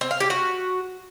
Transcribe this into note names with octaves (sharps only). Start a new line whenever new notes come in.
C4
F5
G4
F#4